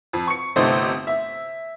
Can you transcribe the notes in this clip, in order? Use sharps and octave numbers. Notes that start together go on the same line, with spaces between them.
F2
C#6 C#7
G1 C3 A3 D#4 C5
E5